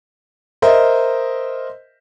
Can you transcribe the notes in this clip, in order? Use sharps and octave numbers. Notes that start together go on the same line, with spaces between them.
A#4 C5 D#5 E5